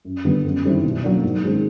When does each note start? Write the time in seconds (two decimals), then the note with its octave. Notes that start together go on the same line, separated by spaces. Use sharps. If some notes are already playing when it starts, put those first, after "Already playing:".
0.05 F#2
0.25 D3 G3 B3 D4
0.45 F#2
0.65 D#3 G3 C4 E4
0.84 B2
1.04 F#3 A#3 D4
1.23 G#2
1.43 D#3 G#3 C4